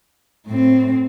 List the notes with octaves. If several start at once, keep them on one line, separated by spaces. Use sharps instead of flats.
A2 C4